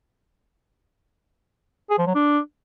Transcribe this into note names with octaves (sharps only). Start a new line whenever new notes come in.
G#4
F3
F#3
D4